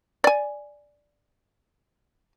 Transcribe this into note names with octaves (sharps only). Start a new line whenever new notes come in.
D5 G#5